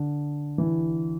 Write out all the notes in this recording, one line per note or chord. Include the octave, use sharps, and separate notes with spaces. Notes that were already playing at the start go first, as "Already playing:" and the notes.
Already playing: D3
E3